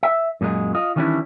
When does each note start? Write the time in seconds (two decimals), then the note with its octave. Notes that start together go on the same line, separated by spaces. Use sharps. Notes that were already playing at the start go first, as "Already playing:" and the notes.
0.03 E5
0.41 F#2 A#2 F#3 G#3
0.75 F4 D#5
0.96 D#3 E3 G3 C#4 D4 E4